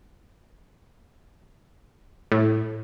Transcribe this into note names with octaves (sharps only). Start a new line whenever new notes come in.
A2